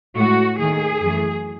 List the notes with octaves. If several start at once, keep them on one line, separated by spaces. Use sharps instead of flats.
A2 G#3 F#4
D#2 D#3 A3 G#4
F#2 E3 A3